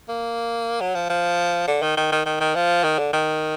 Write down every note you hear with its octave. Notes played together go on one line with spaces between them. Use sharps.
A#3
F#3
F3
F3
D3
D#3
D#3
D#3
D#3
D#3
F3
D#3
D3
D#3